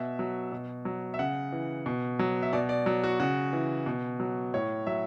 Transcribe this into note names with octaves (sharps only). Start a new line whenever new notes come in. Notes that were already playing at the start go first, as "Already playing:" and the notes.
Already playing: B2 E5
F#3
B2
F#3
E5
C#3 F#5
E3
B2
F#3
E5
B2 D5
D5
F#3
F#4
C#3 F#4
E3
B2
F#3
A2 C#5
F#3 E5